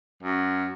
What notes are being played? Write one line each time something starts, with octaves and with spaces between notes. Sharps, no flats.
F#2